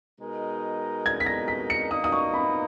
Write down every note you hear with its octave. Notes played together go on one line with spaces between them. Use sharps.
B2 G#3 D#4 A#4
G#6
B6
A#6
B6
C#7
B2 A#3 D#4 D#6
D#6
C#6
B5